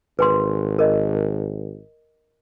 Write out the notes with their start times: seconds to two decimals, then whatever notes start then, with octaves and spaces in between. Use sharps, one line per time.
0.19 G#1 B4 G#5 C6
0.79 A#4 D#5